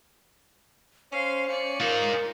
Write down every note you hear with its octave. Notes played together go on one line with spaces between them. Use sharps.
C#4 C5 F5 C6
C#4 D5 C#7
D#4 F4 G#4 A#4